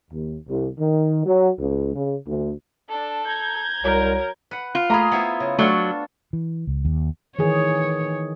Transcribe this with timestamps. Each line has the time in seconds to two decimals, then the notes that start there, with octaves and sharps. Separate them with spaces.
0.11 D#2
0.47 C2
0.79 D#3
1.25 F#3
1.58 C#2
1.94 C#3
2.26 D2
2.89 D4 A4
3.26 A#5 G6 G#6
3.84 C2 F#3 A#4
4.51 B4 F#5
4.75 F4
4.90 A3 A#3 G#4 A#5 B5
5.12 B3 E4 C5
5.40 C#3
5.59 F#3 A3 D4 F4 A4 C#6
6.33 E3
6.67 C#2
6.85 D#2
7.39 D#3 E3 G#4 C#5